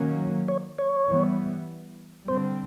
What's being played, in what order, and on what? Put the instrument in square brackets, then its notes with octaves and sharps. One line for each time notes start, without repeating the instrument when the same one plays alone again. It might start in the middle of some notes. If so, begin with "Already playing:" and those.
Already playing: [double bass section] D#3 F#3 A#3 C#4
[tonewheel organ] C#5
C#5
[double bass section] E3 G3 B3
[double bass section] D3 G3 C4 [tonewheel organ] C5